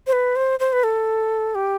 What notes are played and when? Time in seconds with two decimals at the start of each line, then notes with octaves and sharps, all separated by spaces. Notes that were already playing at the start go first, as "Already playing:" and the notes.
0.07 C5
0.13 B4
0.36 C5
0.60 C5
0.73 B4
0.84 A4
1.55 G4